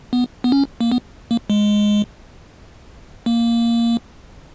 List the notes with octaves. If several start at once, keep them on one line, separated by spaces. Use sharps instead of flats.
B3
B3
C#4
A#3
B3
A#3
G#3
A#3